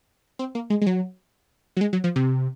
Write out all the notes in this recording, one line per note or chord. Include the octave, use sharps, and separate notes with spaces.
C4
A#3
G#3
G#3
F#3
F#3
G#3
F#3
F3
C3